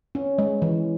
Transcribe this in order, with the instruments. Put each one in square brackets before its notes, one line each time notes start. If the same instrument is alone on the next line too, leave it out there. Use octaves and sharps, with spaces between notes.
[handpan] C#4
G#3
E3